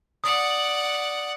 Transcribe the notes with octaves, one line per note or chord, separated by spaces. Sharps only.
D5 F#5 D#6